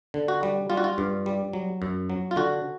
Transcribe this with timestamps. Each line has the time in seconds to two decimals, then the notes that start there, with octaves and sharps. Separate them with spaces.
0.14 D3
0.28 F#4
0.43 G3
0.70 G3 F4
0.77 F#4
0.84 F4
0.98 G2
1.26 G3
1.53 F#3
1.82 F#2
2.10 F#3
2.31 F4
2.36 D3 F#4